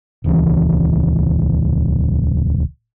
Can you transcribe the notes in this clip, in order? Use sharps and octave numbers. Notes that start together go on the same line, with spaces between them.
D#1 C#2 E3